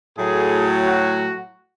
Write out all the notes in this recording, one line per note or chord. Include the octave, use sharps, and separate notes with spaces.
A2 F#3 G#4
F#4